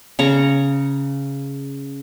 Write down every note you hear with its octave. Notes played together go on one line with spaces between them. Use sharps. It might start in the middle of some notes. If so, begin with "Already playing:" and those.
C#3 A#5 C#6